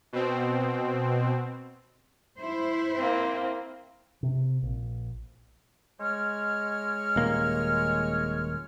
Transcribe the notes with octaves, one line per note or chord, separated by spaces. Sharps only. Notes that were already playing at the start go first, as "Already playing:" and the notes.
B2 C4
E4 C5
A#3 C4
C3
A#1
G#3 C#5 F6
D#1 A#3